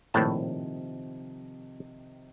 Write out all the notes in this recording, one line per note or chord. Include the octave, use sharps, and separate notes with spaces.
A#1 A2 C3 D#3 F3 A5